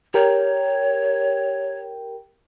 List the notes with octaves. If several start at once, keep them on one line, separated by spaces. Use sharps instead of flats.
G4 A#4 C#5 G5